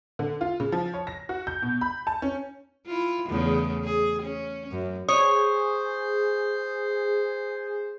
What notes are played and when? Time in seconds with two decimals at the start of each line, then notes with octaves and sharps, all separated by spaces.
0.19 D3
0.41 F4
0.60 C#3
0.72 F3
0.93 C#5
1.07 A#6
1.29 F#4
1.47 G6
1.62 B2
1.81 B5
2.07 A5
2.22 C#4
2.86 E4 F4
3.28 E2 C#3 A3
3.84 G#4
4.22 C#4
4.71 F#2
5.09 G#4 C5 C#5 D#6